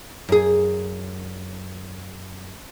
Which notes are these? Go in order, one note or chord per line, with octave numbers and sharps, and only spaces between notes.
F#2 G#4